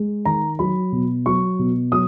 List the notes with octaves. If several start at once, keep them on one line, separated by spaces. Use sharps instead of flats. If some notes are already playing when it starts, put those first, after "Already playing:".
Already playing: G#3
D#3 A#5
F#3 B5
B2
F#3 C#6
B2
F#3 D#6